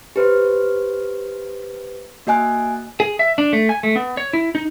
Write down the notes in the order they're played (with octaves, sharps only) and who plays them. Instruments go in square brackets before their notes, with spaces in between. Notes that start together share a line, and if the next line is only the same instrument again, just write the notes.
[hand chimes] G4 B4 C5
A#3 F#4 D#5 G#5 F#6
[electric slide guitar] G#4
E5
D4
A3
G#5
A3
B3
C#5
E4
D#4